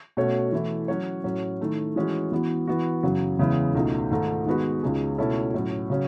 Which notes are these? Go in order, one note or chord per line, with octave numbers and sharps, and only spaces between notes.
B2 A3 C#4 F#4 C#5
E3 A3 E4
F#3 C#4 F#4 C#5
A2 F#3 C#4
D#3 A3 E4
E3 G#3 C#4 F#4 C#5
E3 B3 F#4
E3 B3 F#4
F#2 C#3 F#3
E2 C#3 G#3 B3 E4
C#2 B2 A3 D#4
G#2 D#3 A3 D#4 A4
D#3 G#3 B3 F#4 B4
C#2 C#3 G#3 D#4 G#4
B2 A3 C#4 E4 A4
A2 F#3 C#4
C#3 F#3 C#4